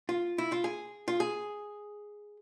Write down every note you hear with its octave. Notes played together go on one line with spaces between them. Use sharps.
F4
E4
F4
G#4
F4
G#4